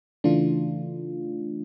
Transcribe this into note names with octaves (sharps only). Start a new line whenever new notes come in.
C#3 E3 A3 D4 F4